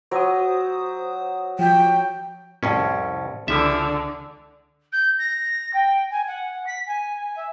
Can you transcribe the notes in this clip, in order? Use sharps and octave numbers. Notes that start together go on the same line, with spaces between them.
F#3 C5 D#6
F3 G5
C2 F2 A2 C#4
C#2 D3 E3 F3 E5
G6
A#6
G5
G#5
F#5
B6
G#5
E5